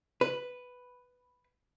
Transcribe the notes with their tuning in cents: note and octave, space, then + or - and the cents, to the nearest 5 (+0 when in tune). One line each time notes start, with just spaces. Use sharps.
B4 +5